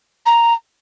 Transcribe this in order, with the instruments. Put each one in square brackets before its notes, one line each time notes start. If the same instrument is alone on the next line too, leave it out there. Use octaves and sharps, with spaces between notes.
[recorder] A#5